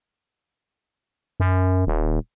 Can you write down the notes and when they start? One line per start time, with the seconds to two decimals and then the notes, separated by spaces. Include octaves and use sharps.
1.40 F#2
1.87 D#1